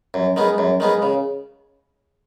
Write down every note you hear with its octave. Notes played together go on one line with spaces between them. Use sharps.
F#2
D#3 G#3 B3
F#2
D#3 G#3 B3
C#3